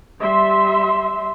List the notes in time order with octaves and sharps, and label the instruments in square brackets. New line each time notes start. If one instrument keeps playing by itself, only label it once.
[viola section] G3 E5 C6